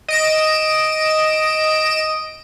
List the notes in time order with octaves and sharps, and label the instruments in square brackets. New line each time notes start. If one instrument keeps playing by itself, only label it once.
[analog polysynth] D#5 D7 E7